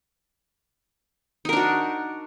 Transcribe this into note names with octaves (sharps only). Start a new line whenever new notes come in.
D4 D#4 F#4 A#4